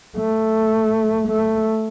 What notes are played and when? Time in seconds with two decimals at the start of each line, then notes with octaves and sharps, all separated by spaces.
0.17 A3
1.28 A3